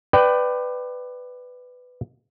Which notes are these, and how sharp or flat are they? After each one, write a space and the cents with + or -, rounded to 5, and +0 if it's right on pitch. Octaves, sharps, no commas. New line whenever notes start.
B4 +15 D5 +20 G5 -10